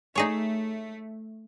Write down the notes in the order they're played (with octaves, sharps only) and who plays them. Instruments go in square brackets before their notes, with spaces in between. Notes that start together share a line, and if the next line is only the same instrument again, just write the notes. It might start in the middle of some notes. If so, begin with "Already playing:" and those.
[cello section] A3 [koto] D#4 G#4 C#5